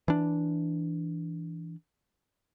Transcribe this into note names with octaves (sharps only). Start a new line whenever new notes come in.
E3 D4